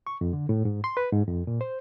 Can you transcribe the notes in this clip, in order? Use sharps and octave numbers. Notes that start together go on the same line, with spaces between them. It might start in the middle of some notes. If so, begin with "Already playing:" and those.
C#6
F2
D3
A2
G#2
C6
B4
G#2
F2
A#2
C5